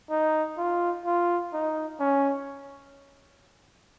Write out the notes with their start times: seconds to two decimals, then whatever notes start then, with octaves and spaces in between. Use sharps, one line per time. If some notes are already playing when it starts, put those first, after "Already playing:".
0.10 D#4
0.58 F4
1.05 F4
1.53 D#4
2.00 C#4